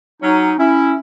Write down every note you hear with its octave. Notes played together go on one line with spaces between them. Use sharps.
F#3 C#4 D#4
C#4 E4